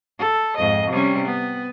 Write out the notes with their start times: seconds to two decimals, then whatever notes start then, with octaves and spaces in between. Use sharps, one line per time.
0.18 A4
0.57 F2 G#2 D#5
0.89 C3 G3 C#4
1.26 B3